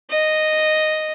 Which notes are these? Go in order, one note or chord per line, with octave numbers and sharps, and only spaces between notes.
D#5